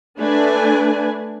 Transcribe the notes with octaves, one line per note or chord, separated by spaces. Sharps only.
A3 D4 B4 G#5